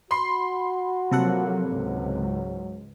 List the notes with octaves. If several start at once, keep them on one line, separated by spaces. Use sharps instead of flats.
F#4 B5 C6 C7
C3 F3 F#3 A#3 A4 F#5
C#2 G#2 F#3